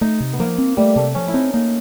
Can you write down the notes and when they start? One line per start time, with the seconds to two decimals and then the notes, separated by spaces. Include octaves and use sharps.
0.01 A3 D#4
0.20 C3
0.33 B3
0.39 F3 A#3
0.58 C4
0.77 G3 A3
0.96 C3 A3
1.15 F3 C#4
1.28 E4
1.34 C4 D#4
1.53 A#3 D#4